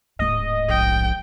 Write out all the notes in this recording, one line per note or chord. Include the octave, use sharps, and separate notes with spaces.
D1 G#2 D#5
A#1 G5